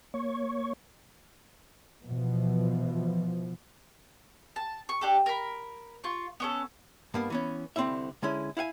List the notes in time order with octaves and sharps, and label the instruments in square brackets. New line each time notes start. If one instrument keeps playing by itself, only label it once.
[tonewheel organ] A#3 C#5 C#6
[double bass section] B2 E3 F3
[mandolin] A5
C#6
D4 G4 A4
A#4 B5
F4 C#6
B3 C#4 A4
[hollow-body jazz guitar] G2 A#3 B3
E3 B3 C#4
C2 D3 C4 C#4 E4 E5
D3 G#3 C#4 E4
E4 F5 F#5 G#5